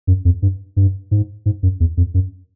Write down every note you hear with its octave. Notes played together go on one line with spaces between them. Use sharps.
F#2
F2
G2
G2
G#2
G#2
F#2
E2
F2
F#2